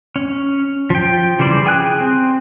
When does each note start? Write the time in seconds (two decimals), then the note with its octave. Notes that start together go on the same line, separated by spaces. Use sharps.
0.16 C#4
0.90 F3 G5
1.39 C#3 E3 G3 C5 D5
1.66 G#4 G5 G#5 F#6
2.01 C4